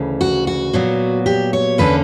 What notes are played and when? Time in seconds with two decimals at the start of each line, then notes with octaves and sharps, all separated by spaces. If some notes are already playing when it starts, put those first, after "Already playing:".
Already playing: D2 C#3 E3
0.21 F#4
0.47 F#4
0.73 A#2 F#3 B3
1.26 G4
1.53 C#5
1.78 E2 D3 A#3 C#4 B4